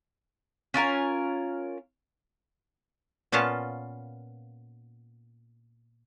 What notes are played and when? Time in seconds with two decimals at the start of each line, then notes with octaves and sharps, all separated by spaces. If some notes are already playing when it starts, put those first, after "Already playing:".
0.74 C#4 F4 A#4 G#5
3.32 A#2 B3 C#4 F4 F5 A5